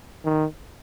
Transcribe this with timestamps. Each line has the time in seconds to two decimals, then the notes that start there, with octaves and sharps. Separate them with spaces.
0.25 D#3